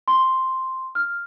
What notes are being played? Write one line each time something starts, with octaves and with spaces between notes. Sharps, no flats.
C6
F6